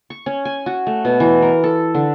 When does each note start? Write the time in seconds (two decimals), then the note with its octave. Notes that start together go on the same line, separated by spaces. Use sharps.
0.10 C#6
0.26 C#4
0.45 G#5
0.66 F#4
0.87 A3
1.05 B2
1.20 E3
1.42 A#4
1.64 A4
1.95 D3